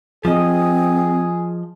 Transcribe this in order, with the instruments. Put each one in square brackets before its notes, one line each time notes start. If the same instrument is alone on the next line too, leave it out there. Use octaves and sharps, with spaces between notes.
[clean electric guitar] F3 D#5 [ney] C4 [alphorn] G#4